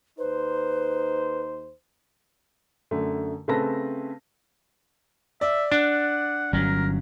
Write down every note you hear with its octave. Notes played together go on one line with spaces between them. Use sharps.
D#2 D#4 B4 C5
F#2 D3 A3
C#3 A3 C4 B4 A5 A#6
D5 E5
D4 F#5
G1 F#3 C#4 A#4